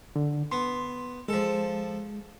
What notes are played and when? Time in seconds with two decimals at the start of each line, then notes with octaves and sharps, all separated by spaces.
0.16 D3
0.52 B3 C6
1.28 F3 G#3 A4